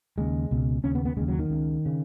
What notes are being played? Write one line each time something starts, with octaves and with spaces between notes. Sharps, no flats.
D#2 C#3 G#3
C#2 B2
D#2 C#3 C#4
B3
B3
D#2 C#3 G#3
F#3
D#3
C#2 C#3
C#3